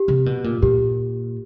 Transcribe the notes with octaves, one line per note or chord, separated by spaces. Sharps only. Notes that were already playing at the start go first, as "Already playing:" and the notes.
Already playing: G4
C3
B2
A#2
A#2 G4